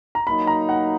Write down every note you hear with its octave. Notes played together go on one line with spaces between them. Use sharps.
A#5
F#3 A#3 D#4 B5
A#5
F#5